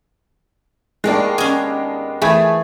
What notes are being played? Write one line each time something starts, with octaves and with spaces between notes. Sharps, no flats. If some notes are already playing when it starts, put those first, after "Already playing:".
D#2 D#3 G#3 B3 D4
C#4 G#4
E3 A3 G#4 E5 G#6